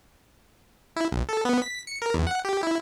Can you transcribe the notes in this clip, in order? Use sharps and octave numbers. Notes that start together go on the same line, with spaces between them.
E4
B1
A4
B3
B6
C#7
A#4
E2
F#5
G4
E4